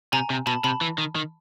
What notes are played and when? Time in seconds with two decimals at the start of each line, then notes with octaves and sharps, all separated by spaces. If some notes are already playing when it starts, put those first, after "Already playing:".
0.13 C3 G#5 A#5
0.30 C3
0.47 B2 A5 B5
0.64 C3 A5 B5
0.81 E3
0.98 D#3
1.15 D#3